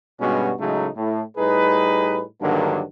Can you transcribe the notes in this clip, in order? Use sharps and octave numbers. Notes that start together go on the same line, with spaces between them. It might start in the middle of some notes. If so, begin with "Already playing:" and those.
G2 B2 G3 G#3 C#4 F#4
A2 C#3 F#3 G#3 A3 D#4
A2
A2 G3 D#4 G#4 B4
G2 D3 D#3 F#3 A#3 D4